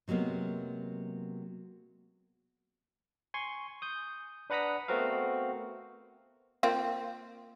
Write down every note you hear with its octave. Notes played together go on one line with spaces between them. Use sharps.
C3 F#3 G#3 A#3 B3
G#5 C6 C#6
D#6 G6
D4 B4 F#5 A#5 D#6 B6
A3 B3 C4 F#4 A#4 F5
A#3 C4 F4